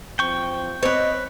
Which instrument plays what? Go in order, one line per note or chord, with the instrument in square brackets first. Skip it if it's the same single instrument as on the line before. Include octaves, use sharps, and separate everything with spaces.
[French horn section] F3 C4 [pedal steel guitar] G5 C#6
[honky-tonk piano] C4 [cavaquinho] B4 C#5 [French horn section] D#5